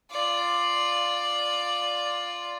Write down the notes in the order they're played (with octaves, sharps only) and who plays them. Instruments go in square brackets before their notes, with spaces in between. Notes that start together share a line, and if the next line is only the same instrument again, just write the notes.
[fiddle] F4 D5